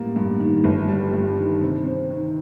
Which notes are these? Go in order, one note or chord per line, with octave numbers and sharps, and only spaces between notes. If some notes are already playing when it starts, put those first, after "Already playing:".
Already playing: A1 G3 A#3
G2
D#3
G1
G3
G2
D#3
C3
C4
D#3